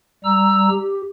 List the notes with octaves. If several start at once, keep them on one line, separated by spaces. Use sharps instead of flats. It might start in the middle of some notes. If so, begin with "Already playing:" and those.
G3 A#5 E6
G4